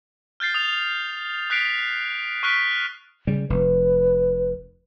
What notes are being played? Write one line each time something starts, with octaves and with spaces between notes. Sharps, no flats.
F6 G6 A6 C7
D#6 F7
D#6 F#6 B6 C7 D7
C#6 F6 F#6 B6 D7
C#3 G3
F1 B4